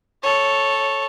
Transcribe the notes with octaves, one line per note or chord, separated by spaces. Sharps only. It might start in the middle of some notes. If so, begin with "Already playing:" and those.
A4 C#5